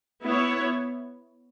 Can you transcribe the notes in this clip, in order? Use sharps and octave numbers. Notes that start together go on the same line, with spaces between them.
B3 E4 C#5